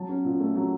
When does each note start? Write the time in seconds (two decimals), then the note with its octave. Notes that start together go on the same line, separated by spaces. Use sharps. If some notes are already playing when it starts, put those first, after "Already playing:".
Already playing: F#3 A5
0.09 C#4
0.25 A#2
0.40 A3
0.56 F#3